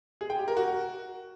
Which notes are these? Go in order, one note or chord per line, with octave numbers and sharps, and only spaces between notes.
G#4
G5
G4
A#4
F#4